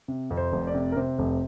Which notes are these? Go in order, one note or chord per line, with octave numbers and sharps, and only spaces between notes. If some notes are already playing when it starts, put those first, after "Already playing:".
C3
F2
C5
F1
D5
C3
A#4
C3 C5
F1